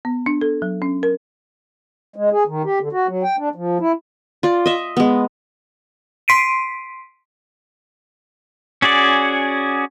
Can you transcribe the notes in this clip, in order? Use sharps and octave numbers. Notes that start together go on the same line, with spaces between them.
B3
D4
A4
F#3
C#4
A#4
G#3
G#4
D#3
G4
D3
F#4
F#3
G5
D4
F3
E4
F4 D5
D#5 E5
G#3 B3
C6 B6 C7 D7 D#7
C#4 F#4 G#4 D5